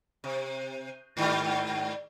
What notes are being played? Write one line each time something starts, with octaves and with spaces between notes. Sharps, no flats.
C3
G#2 D#3 G3